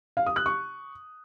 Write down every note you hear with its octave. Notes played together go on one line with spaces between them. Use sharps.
F5
D#6
F#6
C#6